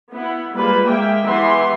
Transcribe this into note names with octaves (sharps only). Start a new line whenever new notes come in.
B3 E4
G3 G#3 A#3 F4 B4
G#3 A#3 G4 E5 G5
E3 G#3 B3 G4 E5 C6